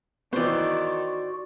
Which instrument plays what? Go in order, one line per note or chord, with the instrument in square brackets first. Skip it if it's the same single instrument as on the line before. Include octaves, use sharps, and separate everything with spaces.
[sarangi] D#3 [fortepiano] E3 B3 [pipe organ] F#4 [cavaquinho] C5 D5